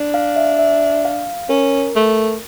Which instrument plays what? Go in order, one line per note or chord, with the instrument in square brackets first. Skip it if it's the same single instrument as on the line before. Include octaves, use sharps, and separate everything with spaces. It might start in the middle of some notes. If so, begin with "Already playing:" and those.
Already playing: [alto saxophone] D4
[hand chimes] F5
E5
E5
F5
[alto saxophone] C#4 [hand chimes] A#4
[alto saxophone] A3